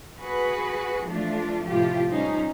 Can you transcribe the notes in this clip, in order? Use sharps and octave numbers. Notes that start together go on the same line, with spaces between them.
F#4 G#4 B4
E3 F3 A3 D4 F4
A2 C3 F3 F4 G4
F3 G3 C#4 D#4 C5